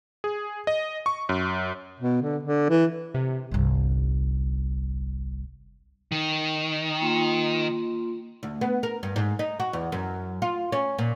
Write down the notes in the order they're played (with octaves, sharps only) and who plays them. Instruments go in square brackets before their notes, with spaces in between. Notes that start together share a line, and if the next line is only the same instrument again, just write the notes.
[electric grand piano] G#4
D#5
C#6
F#2
[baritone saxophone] B2
D3
D3
E3
[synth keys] C3
[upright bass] G1 C2
[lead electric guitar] D#3
[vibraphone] A#3 F4 C6
[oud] D2
B3
A#4
G2
G#2
D#4
F#4
E2
F#2
F4
C#4
A#2